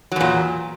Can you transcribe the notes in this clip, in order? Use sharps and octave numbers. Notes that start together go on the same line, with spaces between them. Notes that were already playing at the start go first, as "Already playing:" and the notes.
E2 A#2 F#3